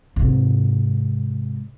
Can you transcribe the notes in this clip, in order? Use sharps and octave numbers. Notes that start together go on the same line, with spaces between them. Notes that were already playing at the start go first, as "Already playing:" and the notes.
G#2 C3